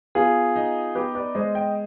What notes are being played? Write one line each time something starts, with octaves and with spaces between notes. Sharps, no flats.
B3 F4 G#4
D#4
B3 G4 B4
B4 D5
G#3 C5 D#5
D#5 G5